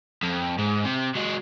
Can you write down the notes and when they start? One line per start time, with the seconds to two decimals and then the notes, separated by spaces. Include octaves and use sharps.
0.23 F2
0.59 G#2
0.85 C3
1.16 F#3 G#3